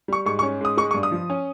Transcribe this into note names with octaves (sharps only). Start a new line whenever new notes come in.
G3 C#6
G#2 C#6
C#6
C#4
G#2 D#6
G#3 C#6
C#6
G2
D#6
F3
C#4